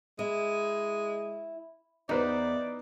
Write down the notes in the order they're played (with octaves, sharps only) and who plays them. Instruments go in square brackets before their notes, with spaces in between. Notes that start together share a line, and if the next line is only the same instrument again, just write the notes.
[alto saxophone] G#3 [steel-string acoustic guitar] E4
[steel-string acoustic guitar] E2 [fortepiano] D#4 B4 C5 [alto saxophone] D5